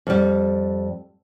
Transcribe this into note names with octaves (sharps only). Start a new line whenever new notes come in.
F2 G3